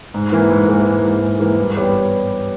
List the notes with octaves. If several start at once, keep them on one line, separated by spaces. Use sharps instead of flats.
G#2
E3 A#3
G#2
E3 A#3
G#2
E3 A#3
G#2
E3 A#3
G2
G3 B3 G4 C#5